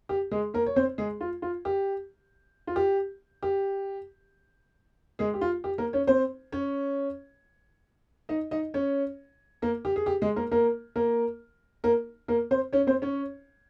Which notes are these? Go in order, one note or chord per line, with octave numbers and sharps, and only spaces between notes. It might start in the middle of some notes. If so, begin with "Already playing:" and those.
G4
G#3 G#4
A#3 A#4
C#5
C4 C5
G#3 G#4
F4
F4
G4
F4
G4
G4
G#3 G#4
G4
F4
G4
A#3 A#4
C#4 C#5
C4 C5
C#4 C#5
D#4 D#5
D#4 D#5
C#4 C#5
A#3 A#4
G4
G#4
G4
G#3 G#4
A#3 A#4
A#3 A#4
A#3 A#4
A#3 A#4
A#3 A#4
C4 C5
C#4 C#5
C4 C5
C#4 C#5